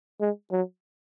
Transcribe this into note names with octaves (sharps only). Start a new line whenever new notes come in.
G#3
F#3